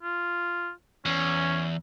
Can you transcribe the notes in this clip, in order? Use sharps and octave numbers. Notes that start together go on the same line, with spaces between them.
F4
E2 C#4